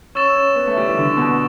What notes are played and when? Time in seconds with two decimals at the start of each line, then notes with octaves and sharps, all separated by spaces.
0.15 C#4 C#6 E6 A6 E7
0.36 C#4
0.56 B3
0.67 A3
0.77 G3
0.88 E3
0.97 D3
1.17 B2